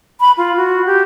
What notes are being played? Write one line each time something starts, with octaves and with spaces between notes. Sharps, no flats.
B5
F4
F#4
G4